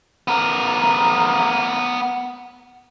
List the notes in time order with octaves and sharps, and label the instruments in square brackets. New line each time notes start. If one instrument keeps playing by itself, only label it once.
[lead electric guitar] B3 A#4